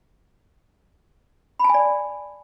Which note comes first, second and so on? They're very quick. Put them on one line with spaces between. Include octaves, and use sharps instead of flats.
B5 A5 G#5 D5